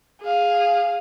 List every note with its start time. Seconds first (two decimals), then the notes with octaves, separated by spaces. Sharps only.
0.22 G#4 F5